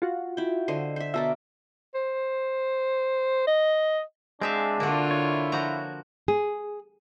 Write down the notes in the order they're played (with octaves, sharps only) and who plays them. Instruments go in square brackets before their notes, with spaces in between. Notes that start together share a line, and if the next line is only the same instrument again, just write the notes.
[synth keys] F4 F#4
[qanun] E4 G5
D3 C5 D#5
C5 E5
[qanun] B2 A#4 D6 [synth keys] E5 A5
[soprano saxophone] C5
D#5
[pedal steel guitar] G#3 G#4 [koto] C4 E5 F5 [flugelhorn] D4
[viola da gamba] D3 F4 [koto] A#3 F#4
[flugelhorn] E4 [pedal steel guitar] C#5
[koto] F3 F#4 A#5
[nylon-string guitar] G#4